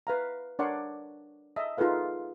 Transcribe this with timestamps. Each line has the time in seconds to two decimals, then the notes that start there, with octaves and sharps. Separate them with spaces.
0.07 B4 F5 A#5
0.59 D4 A#4 C#5 D5 F#5 C6
1.56 D#5 E5 A5
1.77 D#4 F4 G#4 A4 B4 F5